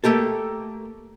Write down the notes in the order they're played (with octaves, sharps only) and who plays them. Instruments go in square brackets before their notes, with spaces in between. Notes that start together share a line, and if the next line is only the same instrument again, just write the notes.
[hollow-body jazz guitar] A3 A#3 G4 A4